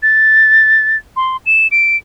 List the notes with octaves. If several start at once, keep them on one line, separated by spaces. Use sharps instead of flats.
A6
C6
E7
D7